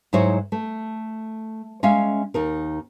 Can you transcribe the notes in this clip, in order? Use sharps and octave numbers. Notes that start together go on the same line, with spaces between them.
G#2 F#3 D#4 E4 C5 C#5
A3
G#3 C#4 E5 F5
D#2 D#4 A#4